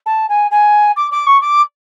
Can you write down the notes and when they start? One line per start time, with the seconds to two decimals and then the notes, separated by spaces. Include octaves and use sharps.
0.06 A5
0.29 G#5
0.51 G#5
0.96 D6
1.11 D6
1.27 C#6
1.41 D6